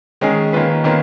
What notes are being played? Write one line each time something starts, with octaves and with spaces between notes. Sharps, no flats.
D#3 G#3 C#4 G#4
D#3 A#3 C#4 F4 B4
D#3 A#3 C#4 F4 B4